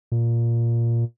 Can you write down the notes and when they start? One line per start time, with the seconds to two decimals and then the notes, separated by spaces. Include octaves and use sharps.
0.12 A#2